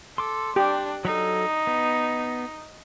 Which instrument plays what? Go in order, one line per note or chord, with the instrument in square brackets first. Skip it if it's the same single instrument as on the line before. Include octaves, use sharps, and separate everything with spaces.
[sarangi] A4 [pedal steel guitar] C6 D6
[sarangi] D4 [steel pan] G4
[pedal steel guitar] F#3 A4 [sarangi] D#4
[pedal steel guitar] B3